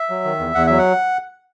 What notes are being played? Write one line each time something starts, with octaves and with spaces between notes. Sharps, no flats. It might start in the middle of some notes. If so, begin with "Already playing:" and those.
Already playing: E5
F#3
D#3
E2
E2 F#5
F#3 E5
F#5